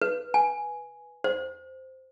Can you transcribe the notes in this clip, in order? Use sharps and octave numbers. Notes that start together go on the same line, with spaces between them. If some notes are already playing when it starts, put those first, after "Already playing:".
B4
G#5
C5